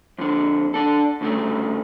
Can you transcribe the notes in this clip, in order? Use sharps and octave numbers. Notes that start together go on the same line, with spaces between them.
F2 D3
D4 A4
D2 C#3 A3